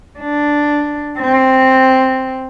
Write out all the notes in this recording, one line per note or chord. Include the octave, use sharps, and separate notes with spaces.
D4
C4